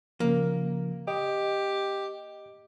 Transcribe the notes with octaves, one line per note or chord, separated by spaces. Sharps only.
C#3 F3 A#3
G4 D#5